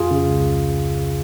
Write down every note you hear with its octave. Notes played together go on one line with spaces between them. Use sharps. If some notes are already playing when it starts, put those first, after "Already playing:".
Already playing: F2 F4 G#4
C#3
C#2